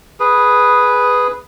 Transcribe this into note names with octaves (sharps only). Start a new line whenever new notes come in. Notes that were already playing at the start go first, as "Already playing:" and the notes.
G#4 B4